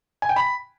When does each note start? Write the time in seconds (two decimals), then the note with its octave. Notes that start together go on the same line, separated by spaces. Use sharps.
0.22 G#5
0.29 G5
0.36 B5